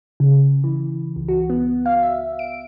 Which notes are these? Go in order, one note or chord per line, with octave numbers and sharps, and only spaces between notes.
C#3
E3
C#2
F#4
B3
F5
E5
D7